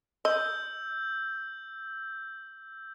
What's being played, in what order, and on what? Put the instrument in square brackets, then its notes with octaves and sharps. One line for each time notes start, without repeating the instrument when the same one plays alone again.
[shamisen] D#5 [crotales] E6 G6